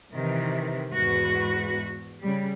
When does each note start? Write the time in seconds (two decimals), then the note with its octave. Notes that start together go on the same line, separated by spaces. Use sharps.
0.13 C3 D#3 E3
0.91 E2 G#2 F#4 B4
2.22 C#3 G3